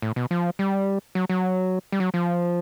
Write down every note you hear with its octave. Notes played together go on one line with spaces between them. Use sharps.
A2
B2
F3
G3
F#3
F#3
G3
F#3
F3